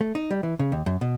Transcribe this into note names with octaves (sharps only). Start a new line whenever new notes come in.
A3
D#4
G3
E3
C#3
D#2
F#2
B2